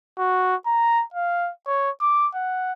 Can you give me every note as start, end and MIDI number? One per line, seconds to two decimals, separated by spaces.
0.19 0.55 66
0.66 1.03 82
1.14 1.50 77
1.67 1.90 73
2.01 2.28 86
2.34 2.72 78